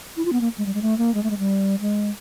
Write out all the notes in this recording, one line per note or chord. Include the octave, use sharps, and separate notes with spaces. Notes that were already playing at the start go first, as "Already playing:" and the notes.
E4
F4
B3
A#3
G#3
G3
G#3
A3
A#3
G#3
A3
G#3
G3
G#3